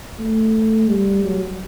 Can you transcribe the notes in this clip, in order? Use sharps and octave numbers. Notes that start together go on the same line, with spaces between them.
A3
G3
F#3